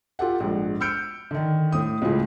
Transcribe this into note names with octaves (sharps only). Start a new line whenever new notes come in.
F4 G4 A4 F#5
A#1 G#2
E6 F6 G6 C#7 D7
D3 D#3
A2 D#6
C#2 A2 C#3 F4 G#4